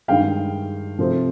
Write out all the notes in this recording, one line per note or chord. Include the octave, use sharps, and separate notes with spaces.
G2 D#3 G#3 F5 G5
C3 F3 A3 C4